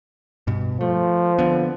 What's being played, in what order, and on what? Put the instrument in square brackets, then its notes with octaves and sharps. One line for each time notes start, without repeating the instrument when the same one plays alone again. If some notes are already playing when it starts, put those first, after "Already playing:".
[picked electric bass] G2 B2
[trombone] F3 [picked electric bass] A3
[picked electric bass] D3 B3